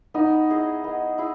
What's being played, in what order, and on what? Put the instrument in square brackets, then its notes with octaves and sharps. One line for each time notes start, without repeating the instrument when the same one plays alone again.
[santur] B3 [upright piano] D#4
[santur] E4 G#4 D#5
B3
E4 G#4